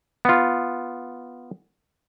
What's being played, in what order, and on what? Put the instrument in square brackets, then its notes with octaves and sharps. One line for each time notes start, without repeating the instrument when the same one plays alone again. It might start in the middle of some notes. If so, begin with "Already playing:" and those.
[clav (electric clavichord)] B3 F4